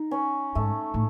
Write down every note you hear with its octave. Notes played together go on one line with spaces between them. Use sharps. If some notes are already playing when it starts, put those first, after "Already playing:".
Already playing: D#4
C#4
G#2 A3
A2